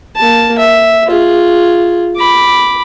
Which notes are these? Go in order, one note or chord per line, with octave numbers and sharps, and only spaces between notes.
A#3 A5
E5
F4 G#4
B5 D6